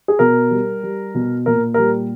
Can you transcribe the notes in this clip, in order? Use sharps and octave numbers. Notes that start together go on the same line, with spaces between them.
G#4
B2 A#4
G3
G3
B2
A#2 A#4
G3 A#4